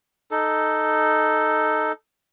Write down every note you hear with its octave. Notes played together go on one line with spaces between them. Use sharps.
D#4 A4